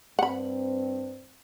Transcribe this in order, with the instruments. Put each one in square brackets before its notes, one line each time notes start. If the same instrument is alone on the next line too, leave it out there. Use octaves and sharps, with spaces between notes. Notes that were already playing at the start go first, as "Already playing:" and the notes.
[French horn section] G2 C4 [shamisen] F#5 B5